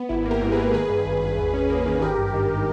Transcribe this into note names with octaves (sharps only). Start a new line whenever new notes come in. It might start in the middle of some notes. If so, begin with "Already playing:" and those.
Already playing: B3
G#1 E4
A#3
G4 A#4
G#2
G#4 B4
A#3
D#3 G#4 B4
G2
G#1
G#1
E2
C#4
A#3
D#3
G#1 G4 A#4
G2
D#3
D#3